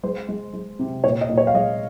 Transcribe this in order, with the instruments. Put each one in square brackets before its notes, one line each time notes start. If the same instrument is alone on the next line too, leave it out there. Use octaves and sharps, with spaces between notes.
[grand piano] G#3 C5
G#3
G#3
C3
A#2 C#5
D#5
A#2
C#5
F5
G#3 D#5